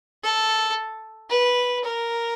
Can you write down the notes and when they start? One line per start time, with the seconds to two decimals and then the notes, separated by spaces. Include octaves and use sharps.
0.23 A4
1.30 B4
1.84 A#4